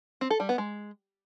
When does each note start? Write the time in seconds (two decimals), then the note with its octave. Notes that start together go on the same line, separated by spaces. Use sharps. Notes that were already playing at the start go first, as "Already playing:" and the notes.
0.21 C4
0.30 A4
0.40 G3
0.49 B3
0.58 G#3